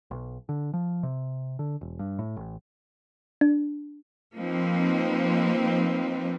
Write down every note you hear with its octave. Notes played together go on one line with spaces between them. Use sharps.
B1
D3
F3
C3
D3
E1
G2
A2
A1
D4
F3 A#3 C4 D#4 B4